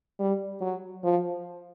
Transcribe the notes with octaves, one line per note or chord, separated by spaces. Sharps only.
G3
F#3
F3